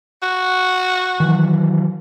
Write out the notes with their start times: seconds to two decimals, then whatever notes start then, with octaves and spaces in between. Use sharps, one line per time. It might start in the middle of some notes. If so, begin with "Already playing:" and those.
0.23 F#4
1.20 D#3 E3 F#3